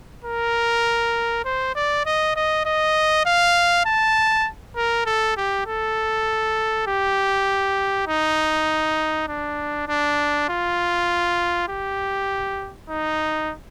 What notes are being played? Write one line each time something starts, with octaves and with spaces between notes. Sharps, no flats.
A#4
C5
D5
D#5
D#5
D#5
F5
A5
A#4
A4
G4
A4
G4
D#4
D4
D4
F4
G4
D#4